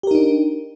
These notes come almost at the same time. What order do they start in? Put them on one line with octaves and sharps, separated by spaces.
G4 A#4 D#4 D4